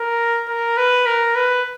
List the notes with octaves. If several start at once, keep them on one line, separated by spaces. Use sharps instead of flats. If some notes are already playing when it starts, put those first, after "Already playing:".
Already playing: A#4
A#4
B4
A#4
B4